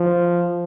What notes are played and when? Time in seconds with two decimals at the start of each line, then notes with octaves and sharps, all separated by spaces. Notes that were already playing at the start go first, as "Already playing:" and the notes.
Already playing: F3